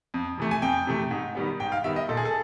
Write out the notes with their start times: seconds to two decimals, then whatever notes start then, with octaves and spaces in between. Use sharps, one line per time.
0.14 F2
0.38 C3 E3 A3
0.51 G#5
0.62 F2 G5
0.87 C3 E3 A3
1.11 G#2
1.35 D#3 G3 B3
1.60 G#2 G5
1.72 F5
1.84 D#3 G3 B3 E5
1.96 D#5
2.09 A#2 A4
2.17 G#4
2.25 A4